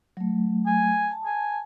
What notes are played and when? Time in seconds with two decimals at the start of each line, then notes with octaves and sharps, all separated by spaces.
0.17 F#3 A3
0.66 G#5
1.11 A5
1.25 G#5